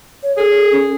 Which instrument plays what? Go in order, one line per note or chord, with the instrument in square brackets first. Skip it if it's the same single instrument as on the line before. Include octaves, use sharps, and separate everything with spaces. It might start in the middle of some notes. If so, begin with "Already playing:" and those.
[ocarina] C#5
[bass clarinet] G#4 [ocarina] A4
[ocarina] C#4